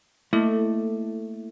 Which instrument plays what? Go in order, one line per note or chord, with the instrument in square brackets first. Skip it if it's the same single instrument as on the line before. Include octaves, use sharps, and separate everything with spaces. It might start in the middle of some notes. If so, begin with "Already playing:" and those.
[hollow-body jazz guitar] A3 [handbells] A#3 E4 A4